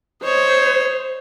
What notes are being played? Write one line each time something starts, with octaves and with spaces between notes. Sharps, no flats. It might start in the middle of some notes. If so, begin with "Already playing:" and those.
C5 C#5 D#5